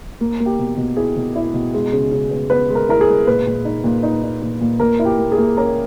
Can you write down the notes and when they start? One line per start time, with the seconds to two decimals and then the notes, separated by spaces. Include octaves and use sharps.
0.21 A#3
0.40 A#3
0.46 G4
0.59 B2
0.77 B2
0.97 E4 G#4
1.16 B2
1.36 E4
1.54 B2
1.74 G#3
1.93 C#3
2.12 C#3
2.31 B3
2.50 B3 B4
2.70 G#3
2.75 A#4
2.89 E4 A#4
3.01 G#4
3.08 G#3
3.27 A#2 B4
3.47 A#2
3.65 D#4
3.84 A#2
4.03 D#4
4.23 D#4
4.42 A#2
4.61 A#2
4.80 A#2 A#4
4.99 E4
5.05 G4
5.18 A#3
5.32 G#4
5.38 A#3
5.57 C#4 A#4